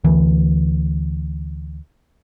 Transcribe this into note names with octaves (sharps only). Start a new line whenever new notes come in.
D2 E3